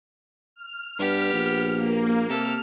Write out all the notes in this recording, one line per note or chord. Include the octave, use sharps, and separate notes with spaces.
F6
G2 B3 G4
A#1
A#3
C3 G4 A4 F6